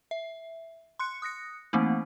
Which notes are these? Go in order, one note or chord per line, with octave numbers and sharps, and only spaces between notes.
E5
C6 F#6 C#7
D#6 F#6 A#6 C#7
E3 A3 A#3 C4 D#4